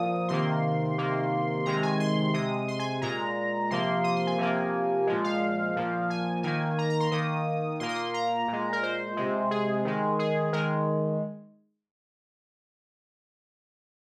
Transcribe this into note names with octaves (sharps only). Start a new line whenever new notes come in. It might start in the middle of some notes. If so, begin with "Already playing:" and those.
Already playing: A#2 F3 A#3 D#6
C3 D#3 A#3 C6
C3 D#3 A#3
C3 D#3 G#3 A#5
G#5
C6
C3 G#3 D#6
C6
G#5
G#5
A#2 G#3 A#5
C3 F3 A#3 C6
D#6
C6
G#5
C3 F3 A#3
A#2 F3 G#3
F5
A#2 F3 A#3
G#5
D#3 A#3 G#5
A#5
A#5
C6
D#3 A#3 D#6
A#2 A#3 C6
D#6
C6
A#5
A#2 G#3
A#4
C5
C3 G#3
G#4
D#3 G#3
G#4
D#3 G#3 A#4